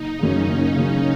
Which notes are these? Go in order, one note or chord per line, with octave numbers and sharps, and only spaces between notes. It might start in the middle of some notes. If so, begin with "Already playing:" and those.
Already playing: F#1 D#4
F#2 C#3 C#4
F#1 D#4
F#2 C#3